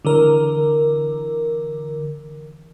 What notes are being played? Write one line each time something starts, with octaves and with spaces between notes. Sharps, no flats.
D3 E3 A#4